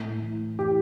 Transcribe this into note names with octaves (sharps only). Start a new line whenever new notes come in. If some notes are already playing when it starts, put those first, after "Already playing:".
Already playing: A2
E3
E3 G4